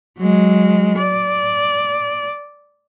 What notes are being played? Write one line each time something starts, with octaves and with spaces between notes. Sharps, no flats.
F#3 G#3
D5